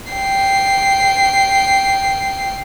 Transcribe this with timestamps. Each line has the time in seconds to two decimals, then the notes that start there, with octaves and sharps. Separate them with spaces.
0.12 G5 C7